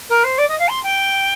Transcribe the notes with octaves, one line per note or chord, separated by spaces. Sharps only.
A#4
C5
D5
D#5
F5
C6
G5